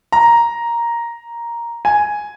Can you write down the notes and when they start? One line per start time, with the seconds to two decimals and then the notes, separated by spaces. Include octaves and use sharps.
0.12 A#5
1.85 G#5